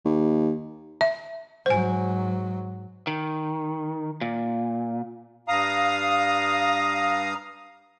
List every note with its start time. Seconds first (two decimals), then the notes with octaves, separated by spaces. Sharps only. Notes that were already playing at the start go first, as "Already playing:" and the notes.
0.05 D#2
1.01 E5
1.66 G#2 F#3 C5 G#5
3.07 D#3
4.21 A#2
5.48 G2 F5 A#5 D#6